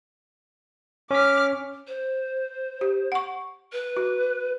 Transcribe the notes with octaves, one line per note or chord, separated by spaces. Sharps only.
C#4 D6 F6 B6
C5
G4
F#5 C#6
B4
F#4